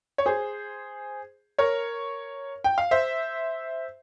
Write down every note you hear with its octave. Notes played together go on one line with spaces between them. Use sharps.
C#5
G#4 C5
A#4 C#5
G5
F5
C5 E5